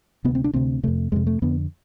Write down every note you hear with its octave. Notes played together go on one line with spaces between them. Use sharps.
D2 C3 B3
C4
D4
D2 C3 C4
F2 C3 A3
F2 C3 G#3
A3
F2 D3 B3